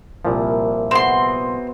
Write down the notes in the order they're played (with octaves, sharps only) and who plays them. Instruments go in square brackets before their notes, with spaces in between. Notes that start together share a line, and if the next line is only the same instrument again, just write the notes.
[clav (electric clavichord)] C2 A#2 F3 [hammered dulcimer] A#3 E4
[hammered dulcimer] B3 F#4 G#4 [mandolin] C4 C6